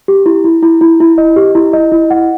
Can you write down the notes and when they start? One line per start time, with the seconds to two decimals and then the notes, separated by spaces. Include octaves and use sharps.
0.08 G4
0.26 E4
0.44 E4
0.62 E4
0.81 E4
1.00 E4
1.18 D#5
1.36 G4
1.55 E4
1.73 D#5
1.92 E4
2.10 F#5